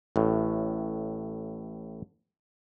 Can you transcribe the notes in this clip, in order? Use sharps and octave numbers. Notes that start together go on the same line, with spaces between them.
A1 A2